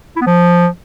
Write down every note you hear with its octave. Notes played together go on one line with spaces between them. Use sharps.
E4
B3
F3